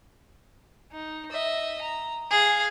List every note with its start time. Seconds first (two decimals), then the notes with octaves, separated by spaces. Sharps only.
0.92 D#4
1.31 D#5 E5
1.82 A#5
2.31 G#4 F5